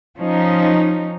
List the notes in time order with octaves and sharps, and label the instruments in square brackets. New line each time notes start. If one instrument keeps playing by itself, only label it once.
[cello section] F3 C#4 D#4